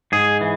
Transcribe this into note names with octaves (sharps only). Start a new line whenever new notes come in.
G#2 G#4
E3